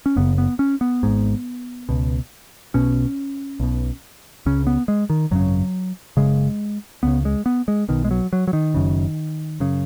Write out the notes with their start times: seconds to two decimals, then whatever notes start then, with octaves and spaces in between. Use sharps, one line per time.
0.06 C#4
0.16 F#1 F#2 C#3 B3
0.38 B3
0.59 C#4
0.81 B3
1.03 G#1 G#2
1.89 C#2 B2
2.74 B1 B2 C#4
3.60 B1 B2
4.46 C#2 C#3 C#4
4.67 B3
4.88 G#3
5.10 D#3
5.31 G#1 F#2 C#3 F#3
6.17 F#1 F#2 C#3 G#3
7.03 C#2 C#3 B3
7.25 G#3
7.46 B3
7.68 G#3
7.89 B1 B2 D#3
8.05 G#3
8.11 F#3
8.33 F#3
8.48 F#3
8.53 D#3
8.74 F#1 F#2 C#3
9.60 F#2 C#3